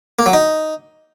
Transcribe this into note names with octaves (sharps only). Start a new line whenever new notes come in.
A#3
F#3
D#4